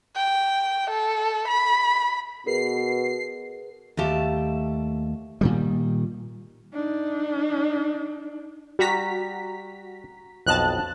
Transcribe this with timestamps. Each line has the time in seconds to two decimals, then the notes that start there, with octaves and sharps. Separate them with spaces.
0.16 G5
0.90 A4
1.48 B5
2.46 B2 G#4 A#4 B4 C7
3.97 D#2 A3 G4 A5
5.41 A#2 D#3 G3
6.74 D4 D#4
8.79 G3 F#4 A#5 B6
10.46 B1 F2 D#5 A5 F#6